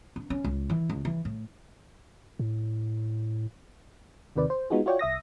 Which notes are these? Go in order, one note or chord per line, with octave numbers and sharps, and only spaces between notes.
D4
C#4
C#2
E3
C#2
E3
A2
A2
D#2 C3 D#3 B4 D5
C5
G#3 B3 D#4 F4 F#4 G#4
F4 F#4 C#5 D5 G5
C2 E5 D#6 A#6